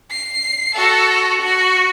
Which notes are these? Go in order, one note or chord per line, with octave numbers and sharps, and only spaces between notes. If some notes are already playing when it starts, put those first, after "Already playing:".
C7
F#4 A4
F#4